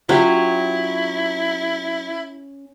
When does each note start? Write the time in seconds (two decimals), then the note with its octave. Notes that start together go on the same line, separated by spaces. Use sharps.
0.09 F#3 C#4 E4 F4 G4